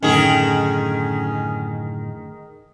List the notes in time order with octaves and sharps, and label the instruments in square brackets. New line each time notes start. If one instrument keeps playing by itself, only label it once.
[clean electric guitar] F#2 A2 D3 [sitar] D#3 G#4 [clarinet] C#4